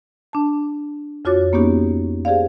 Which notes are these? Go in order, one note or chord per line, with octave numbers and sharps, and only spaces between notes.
D4 A5
F2 F4 F#4 C#5 D6 A6
A#3 B3 C#4 D#4 G4
G4 G#4 C5 D5 F5